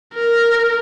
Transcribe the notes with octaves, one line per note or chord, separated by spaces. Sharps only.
A#4